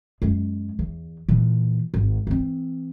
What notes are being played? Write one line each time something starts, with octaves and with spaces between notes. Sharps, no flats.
F#2 G#3
E2
A#2 E3
G#1
E3 C4